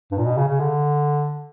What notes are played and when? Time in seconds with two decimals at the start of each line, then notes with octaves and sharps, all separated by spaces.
0.12 G2
0.18 A#2
0.26 B2
0.37 C#3
0.49 C#3
0.60 D3